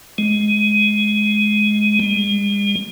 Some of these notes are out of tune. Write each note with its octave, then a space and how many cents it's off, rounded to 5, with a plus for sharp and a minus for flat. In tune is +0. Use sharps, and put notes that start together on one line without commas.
G#3 +15
G#3 -45